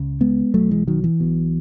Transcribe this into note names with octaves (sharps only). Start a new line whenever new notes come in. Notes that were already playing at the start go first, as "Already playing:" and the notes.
Already playing: C#2 C#3
G#3 B3
B1 B2 F#3 A3
E3 G#3
D#3 F#3
E3
B1 B2